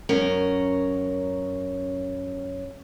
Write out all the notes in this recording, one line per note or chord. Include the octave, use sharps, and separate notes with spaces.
F#2 C#4 A#4